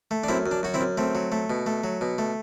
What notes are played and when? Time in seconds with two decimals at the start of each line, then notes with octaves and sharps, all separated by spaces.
0.11 A3
0.24 D4
0.28 F#2 C4 E4
0.46 F#2
0.51 D4
0.63 F#2 F#4
0.74 C4 E4
0.81 F#2
0.98 A3 C4
1.15 F#3
1.32 A3
1.50 B2
1.66 A3
1.84 F#3
2.01 B2
2.18 A3